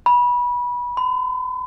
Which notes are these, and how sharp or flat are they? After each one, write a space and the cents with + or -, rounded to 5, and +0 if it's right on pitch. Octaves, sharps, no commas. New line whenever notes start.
B5 -20
B5 +45